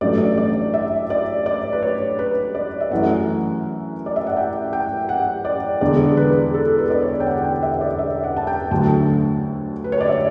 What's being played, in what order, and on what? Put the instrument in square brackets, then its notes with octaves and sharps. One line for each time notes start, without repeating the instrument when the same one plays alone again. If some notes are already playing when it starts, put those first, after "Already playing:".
[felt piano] A1 G2 F#3 A3 D5
D5
E5
D5
D5
B4
C#5
B4
D5
E5
F#2 E3 A3 F#5
D5
E5
F#5
G5
G5
F#5
D5
E1 E2 D3 D5
B4
A4
B4
D5
C#5
G5
F#5
G5
E5
D5
E5
F#5
A5
G5
D2 D3 F#3 A3 A5
B4
C#5
D5
E5